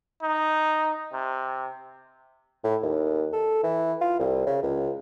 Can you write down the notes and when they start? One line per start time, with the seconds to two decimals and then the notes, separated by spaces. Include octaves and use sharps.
0.22 D#4
1.12 C3
2.64 A2
2.83 D#2
3.33 A4
3.63 E3
4.01 F4
4.19 C2
4.47 C#3
4.63 C#2